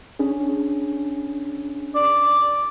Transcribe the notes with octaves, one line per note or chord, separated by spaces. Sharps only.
C#4 D4 G#4
D5